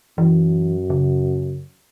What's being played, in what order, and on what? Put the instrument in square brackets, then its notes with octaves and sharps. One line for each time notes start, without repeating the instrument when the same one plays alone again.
[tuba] F#2 [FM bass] E3
[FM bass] C#3